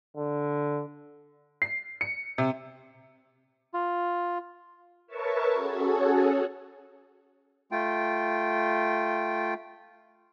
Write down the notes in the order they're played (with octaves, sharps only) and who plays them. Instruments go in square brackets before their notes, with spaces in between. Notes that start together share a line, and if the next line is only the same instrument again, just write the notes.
[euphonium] D3
[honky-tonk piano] C7
C#7
C3
[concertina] F4
[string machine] A#4 B4 C#5 E5 A5 C#6
C#4 F#4 G#4 A4 C#5
[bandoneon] A3 F4 G5